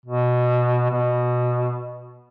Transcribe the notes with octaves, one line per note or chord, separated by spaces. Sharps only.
B2
B2